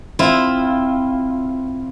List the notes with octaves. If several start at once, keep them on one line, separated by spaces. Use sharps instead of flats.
C4 E4 F4